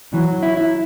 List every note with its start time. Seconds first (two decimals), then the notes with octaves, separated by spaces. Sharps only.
0.13 E3 F#3
0.43 E4
0.57 E4